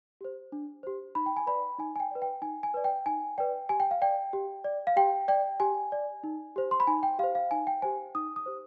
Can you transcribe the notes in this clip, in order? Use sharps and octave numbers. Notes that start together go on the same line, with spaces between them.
G4 C5
D4
G4 C5
D#4 B5
G5
G#5
B4 D5 B5
D#4 G#5
G#5
G5
B4 D5
G5
D#4 G#5
G#5
B4 D5
G5
D#4 G#5
B4 D5 G5
G4 G#5
G5
F5
D5 G5
G4
D5
F5
G4 G5
D5 G5
G4 G#5
D5
D#4
G4 C5
C6
B5
D#4 G#5
G5
G4 C5 F5
F5
D#4 G#5
G5
G4 C5 G#5
D#4 D#6
D#6
G4 C5